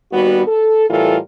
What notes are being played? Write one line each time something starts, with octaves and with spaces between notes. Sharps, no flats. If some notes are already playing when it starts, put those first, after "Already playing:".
D#2 G3 B3 F#4
A4
A2 E3 G3 F4 A4 A#4